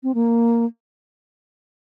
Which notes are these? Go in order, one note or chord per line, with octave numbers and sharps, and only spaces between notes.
C4
A#3